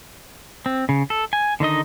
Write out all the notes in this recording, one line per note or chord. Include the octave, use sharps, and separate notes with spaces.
C4
C#3
A4
G#5
D3 D#3 D#4 D#5